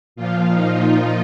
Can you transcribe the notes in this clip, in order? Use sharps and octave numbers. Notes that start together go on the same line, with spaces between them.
A#2 F3 F4
D#4
D#4